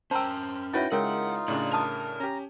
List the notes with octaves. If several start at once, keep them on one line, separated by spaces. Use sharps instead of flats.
C#4 A#4 C5 G5 A5 A#5 E6
D#4 E4 F#4 B4 C#5 E5 G5
C#3 G#3 D#4 F4 A#4 C#5 F#5 G5
A2 C#3 D4 D5
A#4 A5 D#6
C#4 G4 A#5